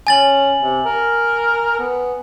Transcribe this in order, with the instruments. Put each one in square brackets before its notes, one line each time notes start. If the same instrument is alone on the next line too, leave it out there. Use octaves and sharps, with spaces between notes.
[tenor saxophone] C#4 [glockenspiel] G#5 A6 F#7
[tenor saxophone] C3
A#4
B3